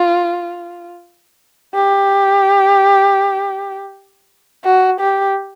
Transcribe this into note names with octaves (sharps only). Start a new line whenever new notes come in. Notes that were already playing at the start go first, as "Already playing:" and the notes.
Already playing: F4
G4
F#4
G4